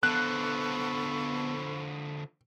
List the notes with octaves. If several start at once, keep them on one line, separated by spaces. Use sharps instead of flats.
D3 F3 B3 A4 B5 C#6 F#6